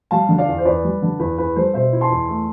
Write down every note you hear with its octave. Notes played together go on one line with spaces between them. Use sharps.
G3 F5 A5
D3
D5 F5
E2
C5
E2 B4 D5
G3
D3
E2 B4
E2 B4
G3 A4 C5
B2 C5 E5
E4
A5 C6
E2
A3